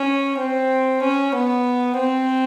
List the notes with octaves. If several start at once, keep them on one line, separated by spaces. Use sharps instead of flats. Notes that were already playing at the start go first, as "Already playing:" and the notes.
Already playing: C#4
C4
C#4
B3
C4